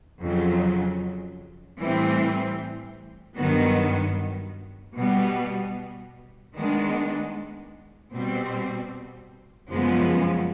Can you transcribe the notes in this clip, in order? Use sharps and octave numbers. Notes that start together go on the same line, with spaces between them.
F2 C#3 F#3
A2 E3 G3 C4
G2 D#3 F#3 B3
B2 G3 B3
D#3 G#3 B3 D4
B2 G3 C4
F#2 C#3 F3 G#3 B3